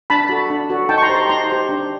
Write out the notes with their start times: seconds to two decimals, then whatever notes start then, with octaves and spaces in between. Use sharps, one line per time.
0.10 D4 A5 B5
0.29 F#4 A4
0.50 D4
0.70 F#4 A4
0.89 D#4 G5 A5
0.98 C#6
1.02 A#5 C6
1.09 G4 C5
1.16 A#5 C6
1.29 D#4 A#5 C6
1.49 G4 C5
1.69 D4